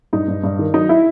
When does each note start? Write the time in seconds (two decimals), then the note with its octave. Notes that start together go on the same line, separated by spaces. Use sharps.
0.13 G2 D#4
0.28 G2
0.44 G2
0.59 D#3
0.74 F#3 D#4
0.89 E4